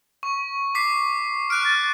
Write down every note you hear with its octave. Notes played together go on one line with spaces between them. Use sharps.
C#6
D6 B6 C7
C#6 F6 F#6 D7
A6